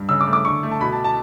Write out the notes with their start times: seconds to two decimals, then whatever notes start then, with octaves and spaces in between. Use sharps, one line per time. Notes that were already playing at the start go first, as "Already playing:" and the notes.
Already playing: G2
0.09 C#3 E6
0.21 D6
0.27 A3
0.33 D6
0.45 D3 C#6
0.63 A3
0.71 A5
0.80 B2 B5
0.92 A5
1.04 A5